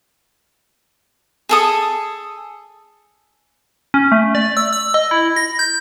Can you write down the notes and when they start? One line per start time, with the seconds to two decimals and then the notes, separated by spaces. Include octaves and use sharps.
1.49 G#4 A4 D#6
3.94 C#4
4.12 A3
4.35 D5
4.57 E6
4.73 E6
4.94 D#5
5.11 E4
5.36 A#6
5.59 G6